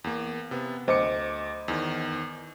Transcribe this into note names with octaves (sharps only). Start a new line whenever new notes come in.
E2 A#3
C3 B3
D2 C5 D#5 D6 C#7
E2 D#3